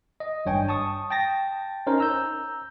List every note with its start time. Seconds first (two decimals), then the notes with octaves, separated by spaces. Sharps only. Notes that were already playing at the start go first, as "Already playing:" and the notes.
0.20 D#5
0.45 G#1 G2 C#5 G5 G#5
0.68 A5 C#6 D#6
1.11 G5 A5 A6 A#6
1.87 C#4 D#4 A#4 C5
1.98 A#5 E6 G6